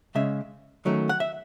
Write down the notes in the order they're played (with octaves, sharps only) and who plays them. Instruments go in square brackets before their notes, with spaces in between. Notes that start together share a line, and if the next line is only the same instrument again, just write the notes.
[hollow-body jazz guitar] C#3 G#3 C#4 E5
D#3 F#3 A3 C#4
F#5
E5